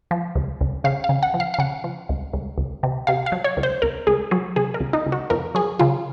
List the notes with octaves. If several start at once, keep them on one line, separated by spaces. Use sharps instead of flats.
F3
C#2
C#2
C#3 F5
F5
C#3
F#5
F3
F5
F5
C#3 F#5
F3
C#2
C#2
C#2
C3
C3 F5
F5
F#3
C#5
C#2
C5
C#2 A#4
C#2 G#4
F#3 G#4
C3 G#4
A#4
C#2
D#4
C#2
F#4
F2 A#4
F#3 G#4
C#3 F4